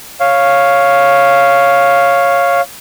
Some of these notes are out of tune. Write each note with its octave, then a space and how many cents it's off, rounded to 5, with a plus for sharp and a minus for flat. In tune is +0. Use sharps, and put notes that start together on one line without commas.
C#5 +0 F5 +0